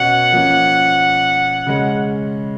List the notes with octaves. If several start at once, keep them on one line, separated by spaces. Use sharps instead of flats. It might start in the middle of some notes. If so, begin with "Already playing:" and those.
Already playing: B2 C#4 F#5
F3 A#3 C#4
C#3 G#3 C#4